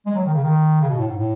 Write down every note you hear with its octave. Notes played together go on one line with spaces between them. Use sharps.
G#3
F#3
D#3
C#3
D#3
C#3
B2
A2
G#2
A2